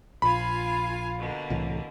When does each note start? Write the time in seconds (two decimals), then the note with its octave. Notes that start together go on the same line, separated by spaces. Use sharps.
0.22 A#1 F4 F5 G#5 B5
1.17 B2 D3 A#3
1.50 C2 A2 E3